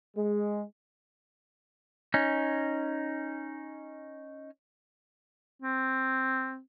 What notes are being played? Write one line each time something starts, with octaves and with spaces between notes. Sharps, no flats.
G#3
C#4 D#4
C4